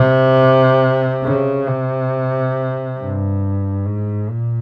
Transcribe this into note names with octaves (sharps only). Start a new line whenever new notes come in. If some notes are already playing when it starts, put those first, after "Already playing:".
Already playing: C3
C#3
C3
G2
G#2
A#2